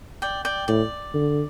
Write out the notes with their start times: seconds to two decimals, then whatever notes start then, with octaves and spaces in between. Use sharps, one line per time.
0.22 D5 G5
0.45 D5 G5
0.68 A2 D5
1.14 D3